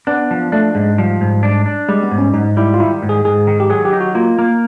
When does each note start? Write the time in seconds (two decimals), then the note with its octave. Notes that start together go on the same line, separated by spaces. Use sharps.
0.07 B3 D4
0.31 F3
0.52 A3 D4
0.75 G#2 G#3
0.98 F3 G3
1.21 G#2
1.43 D4
1.66 D4
1.89 G3 G#3
2.03 B3
2.11 G#2
2.18 C#4
2.34 G#2 D#4
2.57 G3 E4
2.74 F4
2.80 D#3 E4
3.03 G#2
3.09 G#4
3.25 G#2 G#4
3.47 D#3
3.60 G4
3.70 F#3 G#4
3.85 G4
3.93 D#4
4.01 F#4
4.15 A#3 F4
4.39 A#3